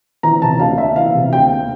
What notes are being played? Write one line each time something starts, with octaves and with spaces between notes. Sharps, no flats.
E3 A#5
C3 A5
D2 F5
A#3 E5
E3 F5
C3
D2 G5
A#3